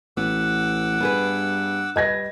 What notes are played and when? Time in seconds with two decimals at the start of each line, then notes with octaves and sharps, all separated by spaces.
0.17 A1 B3 F#5 D6 E6
1.00 G2 B3 G#4 B4
1.96 G3 B4 D#5 G#6 A#6